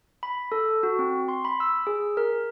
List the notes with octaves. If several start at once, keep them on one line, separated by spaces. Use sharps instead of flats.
B5
A4
F#4
C4
C6
B5
E6
G#4
A#4